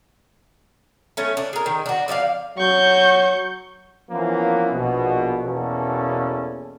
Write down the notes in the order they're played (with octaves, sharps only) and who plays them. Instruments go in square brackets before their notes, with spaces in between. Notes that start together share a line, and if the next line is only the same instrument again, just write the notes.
[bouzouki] A3 C#4
D4
G#4 A#4
D#3
D4 F#4
F3 D5 E5 F5
[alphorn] F#3 [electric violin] C#6 G6
[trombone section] E3 F3 A#3 B3 C#4
A#1 B2
E2 B2 A#3 C#4 A4